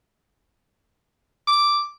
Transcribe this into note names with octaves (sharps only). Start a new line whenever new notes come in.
D6